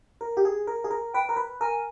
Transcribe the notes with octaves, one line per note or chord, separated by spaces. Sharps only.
A#4
G4
G#4
A#4
G#4
A#4
B4 G5
A#4
B4
A#4 G#5